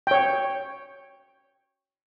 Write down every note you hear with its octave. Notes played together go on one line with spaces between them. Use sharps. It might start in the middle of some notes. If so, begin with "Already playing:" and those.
C#5 G5